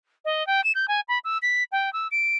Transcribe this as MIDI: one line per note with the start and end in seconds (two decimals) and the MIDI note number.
0.25 0.46 75
0.47 0.64 79
0.64 0.72 100
0.75 0.86 91
0.88 1.00 80
1.08 1.19 83
1.24 1.38 88
1.42 1.63 95
1.72 1.92 79
1.93 2.08 88
2.11 2.37 98